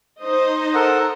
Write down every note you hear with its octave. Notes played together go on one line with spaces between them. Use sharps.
D#4 C5 D#5
A4 A#4 F#5